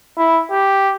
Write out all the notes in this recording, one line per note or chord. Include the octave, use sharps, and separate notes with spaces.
E4
G4